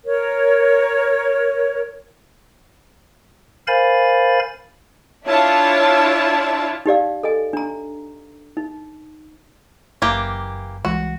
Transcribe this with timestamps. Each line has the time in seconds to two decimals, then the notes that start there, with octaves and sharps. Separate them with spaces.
0.05 A#4 C#5
3.67 A#4 C5 F5 G#5 B5 A6
5.26 D4 E4 F4 C#5 E5 A5
6.86 D#4 G4 D5 F5
7.23 A4 D#5 G#5
7.53 D4 A#5
8.57 D#4
10.02 F#1 E3 A#3 G4
10.85 C2 E3 G#3 F#4